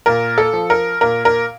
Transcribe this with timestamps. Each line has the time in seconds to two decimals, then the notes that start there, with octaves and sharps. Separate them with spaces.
0.06 A#2 A#4
0.38 A4
0.53 F3
0.70 A#4
1.01 A#2 A#4
1.25 A#4